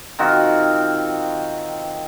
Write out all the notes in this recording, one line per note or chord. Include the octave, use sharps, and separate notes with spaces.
D#3 C4 F4 F#4